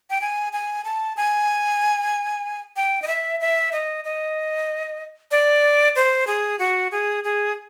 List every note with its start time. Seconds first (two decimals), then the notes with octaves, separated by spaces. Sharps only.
0.10 G5
0.21 G#5
0.53 G#5
0.85 A5
1.17 G#5
2.76 G5
3.02 D#5
3.08 E5
3.41 E5
3.72 D#5
4.05 D#5
5.31 D5
5.96 C5
6.27 G#4
6.59 F#4
6.92 G#4
7.24 G#4